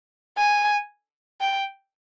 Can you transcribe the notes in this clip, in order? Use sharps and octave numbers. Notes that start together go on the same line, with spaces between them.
G#5
G5